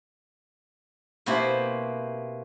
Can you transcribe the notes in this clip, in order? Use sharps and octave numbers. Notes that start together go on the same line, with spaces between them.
B2 A#3 C4 E4 G4